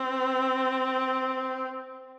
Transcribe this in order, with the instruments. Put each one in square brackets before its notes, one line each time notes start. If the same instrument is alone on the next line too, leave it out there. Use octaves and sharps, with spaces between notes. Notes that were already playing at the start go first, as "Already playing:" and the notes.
Already playing: [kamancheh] C4